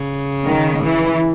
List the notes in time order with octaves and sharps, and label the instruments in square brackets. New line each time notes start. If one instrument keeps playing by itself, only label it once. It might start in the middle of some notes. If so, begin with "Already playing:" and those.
Already playing: [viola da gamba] C#3
[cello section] D#3
E3